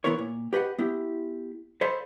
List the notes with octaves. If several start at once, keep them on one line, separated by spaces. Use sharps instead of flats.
E3 F#3 B3 E4 A#4 C#5
A#2
G4 B4 D#5 F#5
B3 E4 G4
A4 C5 D5 D#5 F5 B5